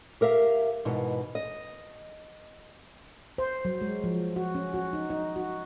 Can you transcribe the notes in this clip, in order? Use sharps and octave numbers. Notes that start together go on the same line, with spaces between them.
G4 A#4 E5 F5
G#2 B2 E3
D#5
C5
F#3
G#3
F3
F#4
C#4
F#4
D#4
D#4
F#4